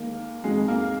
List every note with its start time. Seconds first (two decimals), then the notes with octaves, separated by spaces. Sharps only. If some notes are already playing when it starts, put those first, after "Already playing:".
Already playing: D#2 D#3 G#3 A#3 A#4
0.44 F2 D#3 F#3 G#3 G#4
0.68 A#3 A#4